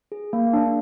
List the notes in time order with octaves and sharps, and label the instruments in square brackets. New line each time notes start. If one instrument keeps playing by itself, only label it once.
[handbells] G#4
A#3
D4